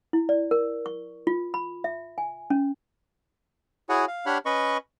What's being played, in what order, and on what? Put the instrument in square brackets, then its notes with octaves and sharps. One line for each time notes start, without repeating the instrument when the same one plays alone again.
[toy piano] E4
D5
A#4
C#6
F4
B5
E5
G#5
C#4
[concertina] E4 F#4 G#4 C#5 F#5 G#5
F5
D4 G4 C#5 F#5 B5 F6
C#4 B4 D#5 B5 C#6